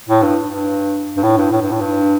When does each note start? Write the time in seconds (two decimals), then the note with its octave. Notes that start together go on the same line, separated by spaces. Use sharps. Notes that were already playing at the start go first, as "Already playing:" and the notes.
0.09 A2
0.23 G2
0.49 G2
1.17 G2
1.23 A2
1.37 G2
1.52 A2
1.62 G2
1.72 A2
1.80 G2